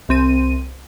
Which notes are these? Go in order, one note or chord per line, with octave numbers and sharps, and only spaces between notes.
C2 C4 D#7